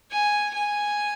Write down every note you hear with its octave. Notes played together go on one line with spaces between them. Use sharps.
G#5
G#5